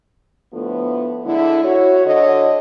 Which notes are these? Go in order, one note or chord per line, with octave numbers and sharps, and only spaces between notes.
A2 D3 F3 A3 B3
D3 G#3 E4
F#4 C#5
D3 C#5 D#5